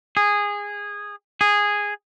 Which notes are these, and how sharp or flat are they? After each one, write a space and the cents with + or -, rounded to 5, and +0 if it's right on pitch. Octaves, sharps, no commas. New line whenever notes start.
G#4 -15
G#4 -10